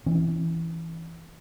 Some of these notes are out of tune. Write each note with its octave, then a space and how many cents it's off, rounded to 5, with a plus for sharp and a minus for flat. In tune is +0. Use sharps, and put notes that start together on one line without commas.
E3 +0 C#4 -10